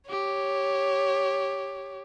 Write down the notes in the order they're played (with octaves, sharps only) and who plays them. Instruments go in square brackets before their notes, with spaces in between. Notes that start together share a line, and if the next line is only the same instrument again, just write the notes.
[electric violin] G4 [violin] C#5